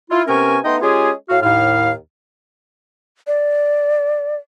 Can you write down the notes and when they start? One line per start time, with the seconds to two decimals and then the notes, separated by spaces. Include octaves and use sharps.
0.10 E4 F4
0.27 C3 B3 C#4 A#4 G#5 C#6
0.65 A3 B3 D#4 D#5 G5 C6
0.81 G#3 C#4 F4 G4 G#4
1.29 A2 F#4 F5
1.43 D#2 A2 F5
3.27 D5